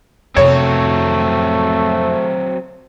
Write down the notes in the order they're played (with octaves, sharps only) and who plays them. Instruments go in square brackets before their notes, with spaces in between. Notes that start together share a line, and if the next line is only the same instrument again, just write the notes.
[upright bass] F2 C3 [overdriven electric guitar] F#3 C4 [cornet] A3 [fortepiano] C#5